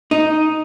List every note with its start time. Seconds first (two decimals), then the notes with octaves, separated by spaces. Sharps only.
0.11 D#4